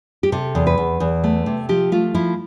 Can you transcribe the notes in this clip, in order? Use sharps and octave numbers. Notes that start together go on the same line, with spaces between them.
G4
C3 A4
E2
B4
E2
E2
A3
C3
F3 G4
A3 F4
F3 E4